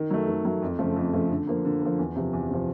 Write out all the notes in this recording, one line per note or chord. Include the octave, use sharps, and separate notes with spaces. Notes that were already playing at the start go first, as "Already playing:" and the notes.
Already playing: D#3
F#3 A3
D#3
F#3 A3
F2
C#3 F3 A3
F2
C#3 F3 A3
D3
F3 A#3
D3
F3 A#3
E2
C3 F3
E2
C3 F3